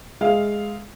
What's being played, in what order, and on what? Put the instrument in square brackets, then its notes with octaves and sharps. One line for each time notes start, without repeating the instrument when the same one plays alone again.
[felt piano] G#3 E5 F5